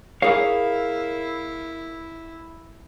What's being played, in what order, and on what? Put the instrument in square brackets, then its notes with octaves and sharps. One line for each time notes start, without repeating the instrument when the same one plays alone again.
[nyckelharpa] E4 [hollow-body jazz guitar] G#4 A#4 C#5 [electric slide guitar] F5